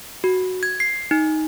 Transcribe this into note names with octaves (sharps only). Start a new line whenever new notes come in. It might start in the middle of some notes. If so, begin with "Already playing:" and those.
F#4
G#6
C7
D#4